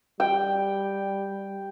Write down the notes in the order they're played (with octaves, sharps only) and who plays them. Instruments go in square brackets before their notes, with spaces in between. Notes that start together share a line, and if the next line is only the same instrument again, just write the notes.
[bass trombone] G3 [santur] G5